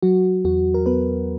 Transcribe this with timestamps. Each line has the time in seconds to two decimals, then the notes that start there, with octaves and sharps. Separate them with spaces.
0.03 F#3 F#4
0.45 E2 F#4
0.74 A#4
0.86 B3 B4